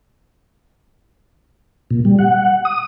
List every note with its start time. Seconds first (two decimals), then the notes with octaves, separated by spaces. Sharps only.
1.91 A#2
2.05 G3
2.19 F#5
2.65 D#6